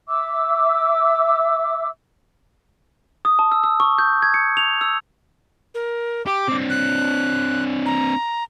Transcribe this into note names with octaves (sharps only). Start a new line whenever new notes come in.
E5 D6 E6
D#6
A5
E6
E6
C#6
G6
G#6
C#7
F7
E6
A#4
G4 D6
C4 D4
F#6
A#5